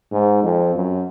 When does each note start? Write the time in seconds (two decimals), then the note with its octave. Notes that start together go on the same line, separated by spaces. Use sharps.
0.12 G#2
0.43 F2
0.74 F#2